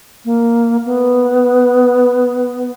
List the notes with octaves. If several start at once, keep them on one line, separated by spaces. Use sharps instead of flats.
A#3
B3